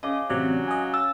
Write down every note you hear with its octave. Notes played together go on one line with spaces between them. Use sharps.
C#3 D#5 D6
A1 C3 F#3 D5
D#5 G#5
E6 A6